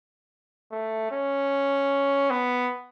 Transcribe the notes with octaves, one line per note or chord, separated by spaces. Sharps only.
A3
C#4
B3